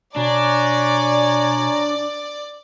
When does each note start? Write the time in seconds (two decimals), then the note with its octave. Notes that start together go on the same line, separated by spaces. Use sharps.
0.16 B2 D4 C#5 D5 G#5 A#5